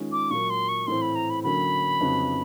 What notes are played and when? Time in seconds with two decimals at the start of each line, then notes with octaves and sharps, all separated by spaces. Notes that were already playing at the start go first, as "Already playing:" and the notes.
Already playing: D#3 G#3 C#4 F4
0.12 D6
0.30 A#2 F#3 A#3 C#6
0.50 C6
0.69 C#6
0.87 A2 E3 A3 C4 C6
1.02 B5
1.15 A#5
1.30 B5
1.44 D3 F#3 A#3 C#4 B5
2.01 F2 C#3 F#3 B3 D#4